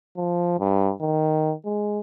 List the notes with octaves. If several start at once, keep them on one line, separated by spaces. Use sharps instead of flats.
F3
G2
D#3
G#3